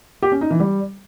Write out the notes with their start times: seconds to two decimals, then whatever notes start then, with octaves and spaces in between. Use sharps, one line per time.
0.22 G4
0.32 C#4
0.41 D#4
0.51 E3
0.60 G3